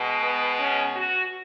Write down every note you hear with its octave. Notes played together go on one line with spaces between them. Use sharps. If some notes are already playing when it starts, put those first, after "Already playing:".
Already playing: B2 G#3
B3
C#4
F#4